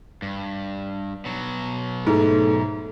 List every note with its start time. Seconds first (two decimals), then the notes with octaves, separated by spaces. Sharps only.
0.22 G2
1.25 B2 F#3
2.07 G#2 A3